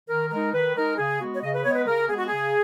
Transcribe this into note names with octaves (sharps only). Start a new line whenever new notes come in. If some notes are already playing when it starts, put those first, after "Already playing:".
D#3 A#4
G#3 D#4 A#4
D#3 B4
G#3 D#4 A#4
C#3 G#4
G#3 B3 F#4
C#5
C#3 D#5
B4
G#3 B3 C#5
B4
C#3 A#4
G#3 B3 G#4
F#4
C#3 G#4